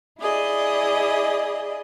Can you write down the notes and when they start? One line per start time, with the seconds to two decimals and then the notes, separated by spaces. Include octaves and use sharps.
0.19 E4 G#4 D5 D#5